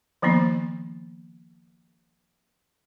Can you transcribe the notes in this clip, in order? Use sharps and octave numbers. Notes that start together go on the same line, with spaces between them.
D#3 F3 A#3 B3 D#4